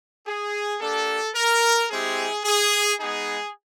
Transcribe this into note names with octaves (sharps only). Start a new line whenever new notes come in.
G#4
A#3 D4 G4 A4
A#4
G#3 C4 E4 G4 G#4
G#4
G#3 B3 D#4 G#4